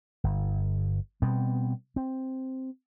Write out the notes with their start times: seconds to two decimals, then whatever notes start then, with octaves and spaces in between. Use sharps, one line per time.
0.24 G1
1.22 B2 G3 B3 C4
1.96 C4